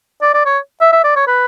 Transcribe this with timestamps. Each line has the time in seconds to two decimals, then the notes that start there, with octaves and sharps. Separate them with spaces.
0.22 D5
0.34 D5
0.46 C#5
0.81 E5
0.92 E5
1.04 D5
1.16 C#5
1.27 B4